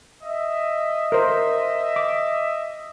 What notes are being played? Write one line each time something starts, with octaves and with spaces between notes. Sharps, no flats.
D#5 E5
A#4 C5
D6